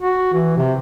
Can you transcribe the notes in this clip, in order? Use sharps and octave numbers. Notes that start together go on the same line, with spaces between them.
F#4
E3
C3